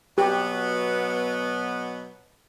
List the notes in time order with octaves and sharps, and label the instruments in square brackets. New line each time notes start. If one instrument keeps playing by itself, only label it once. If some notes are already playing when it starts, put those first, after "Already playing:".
[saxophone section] B2 F#3 B3 [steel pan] G4